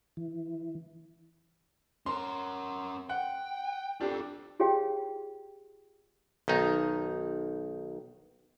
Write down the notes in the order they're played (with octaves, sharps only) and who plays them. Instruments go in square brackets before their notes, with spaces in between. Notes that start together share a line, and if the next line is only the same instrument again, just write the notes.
[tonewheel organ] E3
[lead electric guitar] C#4 A#4 [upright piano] C6
[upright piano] F#5 [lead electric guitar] G5
[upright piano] D4 G4 [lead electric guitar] F4 A4
[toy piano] F4 G4 G#4 C#5 F5 G5
[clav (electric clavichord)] B1 D#3 D#4